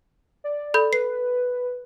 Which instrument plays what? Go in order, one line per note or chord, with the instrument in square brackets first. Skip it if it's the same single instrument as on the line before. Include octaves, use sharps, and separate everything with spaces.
[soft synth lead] D5
[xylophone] A4 B5 G6
[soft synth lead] B4 [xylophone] C7